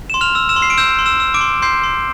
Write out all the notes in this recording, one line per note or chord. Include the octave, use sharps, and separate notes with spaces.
C6 E7
F6 F7
E6
E6 E7
C6
C7
D7
E6 G6 E7
C6
E6 E7
E6
D6 D7
C6
C6 G6 C7
C6